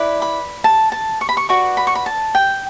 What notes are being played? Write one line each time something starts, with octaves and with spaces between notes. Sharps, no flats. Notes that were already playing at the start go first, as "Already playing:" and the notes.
Already playing: E4 B4 D5
B5
A5
A5
C#6
B5
C#6
F#4 B4 D5 C#6
B5
C#6
B5
A5
G5